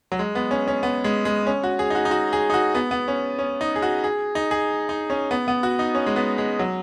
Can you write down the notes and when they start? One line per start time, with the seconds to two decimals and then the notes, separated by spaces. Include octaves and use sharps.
0.12 F#3
0.19 G#3
0.35 B3
0.51 C#4
0.68 C#4
0.83 B3
1.04 G#3
1.25 G#3
1.47 C#4
1.63 F#4
1.79 G#4
1.90 D#4
1.95 F#4
2.05 D#4
2.11 F#4
2.33 G#4
2.50 D#4
2.54 F#4
2.75 B3
2.91 B3
3.08 C#4
3.39 C#4
3.61 D#4
3.76 G#4
3.82 F#4
4.04 G#4
4.35 D#4
4.51 G#4
4.89 D#4
5.10 C#4
5.31 B3
5.48 B3
5.63 F#4
5.79 D#4
5.95 C#4
6.06 G#3
6.16 B3
6.38 G#3
6.59 F#3